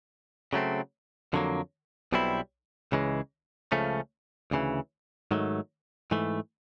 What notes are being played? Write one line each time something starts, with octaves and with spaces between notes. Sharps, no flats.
C#3 F#3 A3 C4
F2 D3 F#3 A#3
B1 B2 G3 C4 E4
C#2 C#3 E3 G#3
C#2 C#3 F3 A3 C#4
D2 C#3 E3
G#2 D#3 F#3 A3
G#2 E3 A3